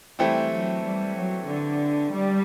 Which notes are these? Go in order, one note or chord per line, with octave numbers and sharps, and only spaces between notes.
E3 G3 A3 C4 E4 G4
F#3
G3
F#3
D3
G3